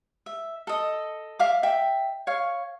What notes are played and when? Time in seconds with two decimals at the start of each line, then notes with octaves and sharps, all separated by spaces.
0.26 E5
0.67 A4 D#5
1.39 E5 F5 D6
1.63 E5 G5
2.27 C#5 F5